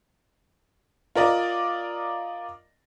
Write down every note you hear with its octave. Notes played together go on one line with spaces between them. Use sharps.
F4 A#4 D5 D#5